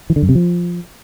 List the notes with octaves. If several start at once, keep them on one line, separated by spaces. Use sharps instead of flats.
E3
D3
F#2
C3
F3